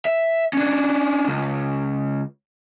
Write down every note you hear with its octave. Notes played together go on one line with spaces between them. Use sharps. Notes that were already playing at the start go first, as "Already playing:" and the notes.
E5
C#4 D4
C#2